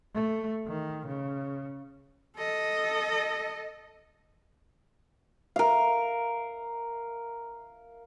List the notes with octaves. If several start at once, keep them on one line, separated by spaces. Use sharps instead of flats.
A3
D#3
C#3
A4 D#5
A#4 F5